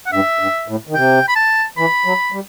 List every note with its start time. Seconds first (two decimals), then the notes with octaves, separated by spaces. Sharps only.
0.06 F#5
0.12 G2 E5
0.39 G2
0.68 A2
0.87 D#3
0.95 C3 G5
1.28 B5
1.36 A5
1.77 E3 B5
2.05 F#3
2.32 G3